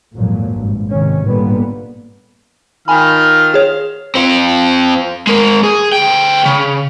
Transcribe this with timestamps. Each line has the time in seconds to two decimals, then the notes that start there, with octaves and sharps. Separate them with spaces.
0.13 G#1 F2 A#2 F3 F#3
0.52 G#1 G2
0.89 G#2 C3 D#3 C#4
1.22 G#1 A#2 D3 G3 B3
2.88 D#3 F4 G#5 B5 F6
3.54 G#4 C#5
4.15 C4 F4
5.27 G#3 A#4
5.63 G#4
5.93 D2 G5
6.46 C#3